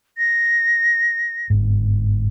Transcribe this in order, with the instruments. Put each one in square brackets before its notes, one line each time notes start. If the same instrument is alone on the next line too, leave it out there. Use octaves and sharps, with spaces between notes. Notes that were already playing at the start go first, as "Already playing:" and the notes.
[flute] A#6
[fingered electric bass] G1 G#2